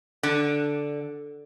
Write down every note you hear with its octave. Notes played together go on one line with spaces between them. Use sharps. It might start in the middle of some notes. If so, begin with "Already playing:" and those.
D3